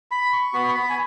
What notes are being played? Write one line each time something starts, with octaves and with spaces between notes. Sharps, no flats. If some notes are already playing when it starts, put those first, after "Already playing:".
B5
C#6
B3 F#4 B5
C#6
B5
G#5